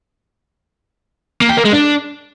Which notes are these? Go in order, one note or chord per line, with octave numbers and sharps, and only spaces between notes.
A#3
G4
A#3
G#3
D4